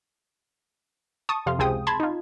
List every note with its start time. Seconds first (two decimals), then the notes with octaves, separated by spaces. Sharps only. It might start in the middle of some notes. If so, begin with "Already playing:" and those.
1.29 A5 C#6 D#6
1.46 F2 C3 F5 C6
1.59 C#2 C3 C4 G#4 G5 D#6
1.87 A5 B5 C6 G#6
2.00 D#4 F4